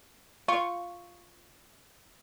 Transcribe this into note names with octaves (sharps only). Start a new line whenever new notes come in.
F4 C#6